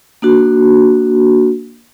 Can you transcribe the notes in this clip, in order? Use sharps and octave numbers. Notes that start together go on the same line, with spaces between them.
A#3 D4 F#4